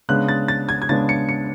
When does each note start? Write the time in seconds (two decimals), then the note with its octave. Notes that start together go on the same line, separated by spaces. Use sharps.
0.09 C#3 G#3 B3 D4 F#6
0.29 A6
0.48 A6
0.69 G#6
0.82 G#6
0.89 C#3 G#3 B3 D4 A6
1.09 C#7
1.29 C#7